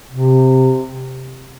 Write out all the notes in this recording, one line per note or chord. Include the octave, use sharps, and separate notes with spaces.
C3